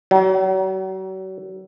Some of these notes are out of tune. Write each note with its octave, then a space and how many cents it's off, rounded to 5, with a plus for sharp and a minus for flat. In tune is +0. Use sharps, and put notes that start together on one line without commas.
F#3 +40